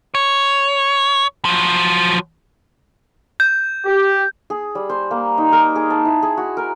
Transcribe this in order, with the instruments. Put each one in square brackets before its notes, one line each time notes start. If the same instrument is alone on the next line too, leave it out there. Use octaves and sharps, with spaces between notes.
[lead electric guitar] C#5
F3 F#3
[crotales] G6
[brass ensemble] G4
[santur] G#4
G3
C5
A#3
D#4
A#4
G#4
A5
E4
G#4
F#4
A#4